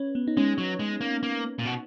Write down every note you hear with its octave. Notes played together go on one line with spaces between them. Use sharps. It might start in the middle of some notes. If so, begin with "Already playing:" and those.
Already playing: C#4 B4 C#5
B3
D#4
G#3 C#4
F#3
G#3
A#3
A#3
A#2
B2